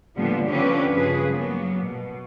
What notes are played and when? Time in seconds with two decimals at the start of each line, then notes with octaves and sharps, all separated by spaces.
0.16 A2 D3 F3 G3 A#3 B3
0.48 D3 F3 C4 C#4 G4 B4
0.95 G2 C#3 F3 G#4 B4
1.30 F#3 A#3 B3
1.83 B2